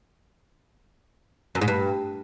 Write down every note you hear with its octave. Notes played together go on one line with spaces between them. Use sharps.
F#2
G#2
G2